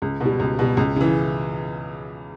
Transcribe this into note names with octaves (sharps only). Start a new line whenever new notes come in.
C#2
B2 G3
C#2
B2 G3
C#2
C#3 E3